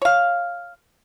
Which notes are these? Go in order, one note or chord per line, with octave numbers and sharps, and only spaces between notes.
C#5 F5